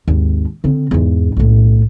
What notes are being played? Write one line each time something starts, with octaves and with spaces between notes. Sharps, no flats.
G#1 D#2
D3 C4
E2 G#2
B1 A2